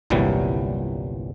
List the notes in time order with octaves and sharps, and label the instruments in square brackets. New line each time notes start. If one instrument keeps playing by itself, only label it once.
[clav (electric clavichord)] G1 C2 A#2 E3 F#3 G3